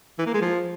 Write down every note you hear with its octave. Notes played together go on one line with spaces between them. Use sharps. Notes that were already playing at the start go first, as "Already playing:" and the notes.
E3
A#3
G#3
F3